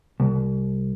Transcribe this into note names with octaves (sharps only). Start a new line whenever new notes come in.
C2